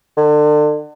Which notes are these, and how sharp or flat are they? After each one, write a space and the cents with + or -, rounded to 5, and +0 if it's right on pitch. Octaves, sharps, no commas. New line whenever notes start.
D3 +35